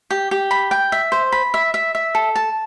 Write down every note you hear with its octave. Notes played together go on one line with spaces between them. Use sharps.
G4
G4
B5
G5
E5
C5
B5
E5
E5
E5
A4
A5